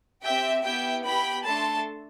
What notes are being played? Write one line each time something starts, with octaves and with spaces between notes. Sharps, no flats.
C4 G4 E5 G5
B3 E4 G4 E5 G5
B3 E4 G4 G5 B5
A3 D4 A4 A5 C6